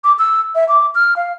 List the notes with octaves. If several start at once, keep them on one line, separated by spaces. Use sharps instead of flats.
D6
E6
E5
D6
F6
F5